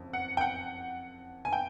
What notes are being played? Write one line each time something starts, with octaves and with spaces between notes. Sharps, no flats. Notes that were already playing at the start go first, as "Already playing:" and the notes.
Already playing: F#1 F2
F#5
G5
F#5
G#5
G5